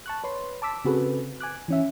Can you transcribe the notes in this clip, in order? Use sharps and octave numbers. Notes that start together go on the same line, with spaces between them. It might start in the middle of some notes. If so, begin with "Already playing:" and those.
A5 C#6 F#6
B4 C#5 C6
A5 D6 E6 B6
C#3 C4 F#4 G#4 A4 B4
G#5 D6 F#6
E3 C#4 E5